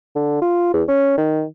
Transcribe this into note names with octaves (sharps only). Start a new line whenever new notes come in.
D3
F4
E2
C#4
D#3